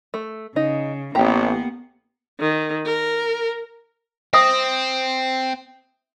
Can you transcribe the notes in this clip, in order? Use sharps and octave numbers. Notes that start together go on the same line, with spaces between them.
A3
C#3 D#4
A1 A#3 B3 G4 A#5
D#3
A#4
C4 E5 D#6